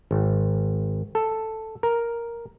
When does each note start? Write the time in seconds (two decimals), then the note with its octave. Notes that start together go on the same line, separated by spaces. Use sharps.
0.11 G#1
1.15 A4
1.83 A#4